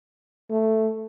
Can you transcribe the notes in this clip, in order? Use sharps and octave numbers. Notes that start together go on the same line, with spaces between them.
A3